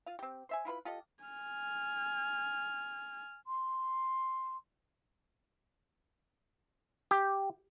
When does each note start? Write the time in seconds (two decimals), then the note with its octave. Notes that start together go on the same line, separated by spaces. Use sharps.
0.06 F4 F5
0.19 C4 G4
0.49 C5 E5 G#5
0.65 E4 F4 B4 B5
0.85 F4 G4 A4 D#5
1.25 G#5 F6
3.46 C6
7.11 G4